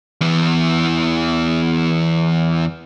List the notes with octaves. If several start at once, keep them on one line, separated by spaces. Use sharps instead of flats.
E2 E3